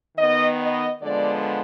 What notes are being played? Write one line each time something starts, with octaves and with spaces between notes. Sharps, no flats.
D#3 B3 D#5
D#5
D3 F3 G#3 B3 D5